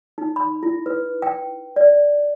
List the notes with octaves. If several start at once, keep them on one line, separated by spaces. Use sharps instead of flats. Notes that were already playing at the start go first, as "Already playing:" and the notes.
D#4
B5
E4
B4
G5
D5